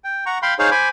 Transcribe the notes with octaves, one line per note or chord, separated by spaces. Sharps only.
G5
F#5 A#5 C#6
F5 G5 B5 C6
D#4 G#4 C5 C#5 F5
C5 G#5 B5 D6